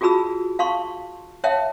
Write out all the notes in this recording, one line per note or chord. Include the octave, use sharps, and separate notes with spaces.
F4 F#4 G#4 A5 B5 E6
F5 A5 C6 C#6
C#5 E5 F5 G5 A5